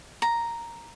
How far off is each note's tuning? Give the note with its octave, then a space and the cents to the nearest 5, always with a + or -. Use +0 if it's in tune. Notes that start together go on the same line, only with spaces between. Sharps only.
A#5 +0